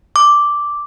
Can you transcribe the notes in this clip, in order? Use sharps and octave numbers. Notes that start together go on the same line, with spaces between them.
D6